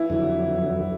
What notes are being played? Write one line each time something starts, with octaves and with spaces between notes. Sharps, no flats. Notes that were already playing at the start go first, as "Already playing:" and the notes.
Already playing: E3 E4
F2 D3 F#3